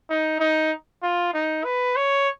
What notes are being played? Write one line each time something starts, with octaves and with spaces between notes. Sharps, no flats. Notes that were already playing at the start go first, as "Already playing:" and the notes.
D#4
D#4
F4
D#4
B4
C#5